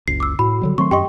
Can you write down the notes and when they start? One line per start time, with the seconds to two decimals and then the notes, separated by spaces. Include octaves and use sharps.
0.08 F#1 C#2 C7
0.20 D6 E6
0.39 A2 F#4 B5
0.62 D3 F#3 G3
0.78 D#3 F#3 A3 C4 C6 C#6
0.91 F#2 G4 D#5 G5 C6 C#6